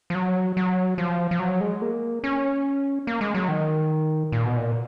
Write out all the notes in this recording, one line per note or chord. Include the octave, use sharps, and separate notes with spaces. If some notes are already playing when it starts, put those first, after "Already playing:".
F3
F#3
F#3
F3
F3
F#3
G#3
A#3
C#4
A#3
G#3
F#3
D#3
A#2
B2
A#2